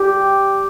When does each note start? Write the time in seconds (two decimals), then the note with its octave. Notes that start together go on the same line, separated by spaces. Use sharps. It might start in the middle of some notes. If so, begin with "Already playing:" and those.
Already playing: G4